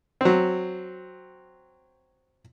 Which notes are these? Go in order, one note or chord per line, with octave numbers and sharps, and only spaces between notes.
F#3 C4